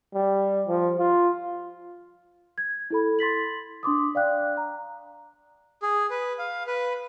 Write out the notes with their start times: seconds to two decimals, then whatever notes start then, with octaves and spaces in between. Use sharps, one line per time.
0.14 G3
0.68 F3
0.98 F4
2.58 G#6
2.90 E4 A4 B5
3.19 C6 A6 B6 F#7
3.83 D4 C6 D6 D#6
4.15 D5 F5 G5 F#6
4.57 A#5
5.81 G#4
6.10 B4
6.38 F5
6.67 B4